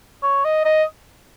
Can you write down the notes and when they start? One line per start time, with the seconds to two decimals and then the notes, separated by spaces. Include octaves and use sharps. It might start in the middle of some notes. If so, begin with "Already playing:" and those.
0.23 C#5
0.45 D#5
0.65 D#5